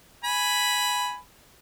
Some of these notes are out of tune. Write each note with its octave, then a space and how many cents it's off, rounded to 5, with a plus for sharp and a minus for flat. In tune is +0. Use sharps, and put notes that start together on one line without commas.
G#5 +5 B5 +0